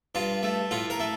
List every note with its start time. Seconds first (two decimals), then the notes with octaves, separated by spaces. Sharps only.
0.15 G2 F4
0.43 A3
0.71 A2 F4
0.90 A#4
1.00 A3